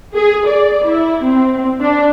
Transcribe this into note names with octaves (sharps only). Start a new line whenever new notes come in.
G#4
D5
E4
C4
D4